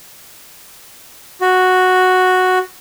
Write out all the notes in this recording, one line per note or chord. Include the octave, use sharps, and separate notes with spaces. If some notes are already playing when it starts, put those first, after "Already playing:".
F#4